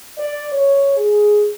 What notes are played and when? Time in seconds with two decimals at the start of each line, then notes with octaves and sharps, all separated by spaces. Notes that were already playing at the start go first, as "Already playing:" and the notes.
0.18 D5
0.52 C#5
0.97 G#4